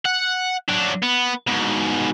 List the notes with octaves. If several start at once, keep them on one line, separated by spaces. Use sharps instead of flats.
F#5
F#3 D4
B3
G#2 B2